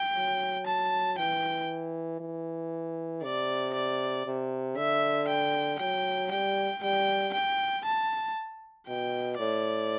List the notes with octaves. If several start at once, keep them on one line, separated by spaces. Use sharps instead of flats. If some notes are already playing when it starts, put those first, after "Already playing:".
Already playing: G5
F#3
A5
E3 G5
E3
C3 D5
D5
C3
D3 E5
G5
F#3 G5
G3 G5
G3 G5
G5
A5
B2 G5
A2 D5